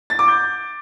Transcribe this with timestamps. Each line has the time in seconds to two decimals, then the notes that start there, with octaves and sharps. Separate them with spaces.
0.10 A6
0.19 D6
0.28 G6